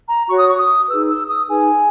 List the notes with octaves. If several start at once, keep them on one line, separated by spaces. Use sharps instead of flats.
A#5
F#4 C#5 C#6
D#6
C#6
D#6
D#4 G#4 B4 E6
E6
D#6
D#4 G#4 B4 G#5